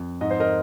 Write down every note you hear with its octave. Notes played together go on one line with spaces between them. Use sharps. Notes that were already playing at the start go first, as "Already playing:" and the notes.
Already playing: F2
G#2 D#5
C5
A#4 D#5